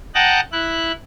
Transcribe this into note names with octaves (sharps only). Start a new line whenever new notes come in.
D#5 F#5 G5 A5 A#5 F#6
E4 F#6